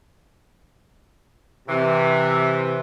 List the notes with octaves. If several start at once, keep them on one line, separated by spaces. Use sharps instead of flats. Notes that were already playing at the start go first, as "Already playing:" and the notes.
C3 E3